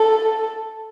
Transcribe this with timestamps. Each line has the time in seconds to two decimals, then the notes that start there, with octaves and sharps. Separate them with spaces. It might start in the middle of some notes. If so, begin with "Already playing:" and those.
Already playing: A4